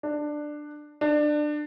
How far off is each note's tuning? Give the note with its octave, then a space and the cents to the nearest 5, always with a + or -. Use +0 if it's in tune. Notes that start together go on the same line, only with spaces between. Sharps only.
D4 +15
D4 +25